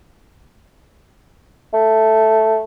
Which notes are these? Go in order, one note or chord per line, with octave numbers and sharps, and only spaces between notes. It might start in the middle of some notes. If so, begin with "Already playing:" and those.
A3